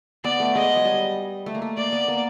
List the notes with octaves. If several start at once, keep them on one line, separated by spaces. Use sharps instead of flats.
B3 D5
A3
G#3 D#5
F#3
G3
A3
A#3
A3
A#3 D5
B3
A#3